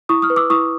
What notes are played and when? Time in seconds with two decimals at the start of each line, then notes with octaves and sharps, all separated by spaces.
0.09 E4 C#6 D#6
0.22 D#6 F6
0.30 B4
0.36 D6 E6
0.50 E4 C#6 D#6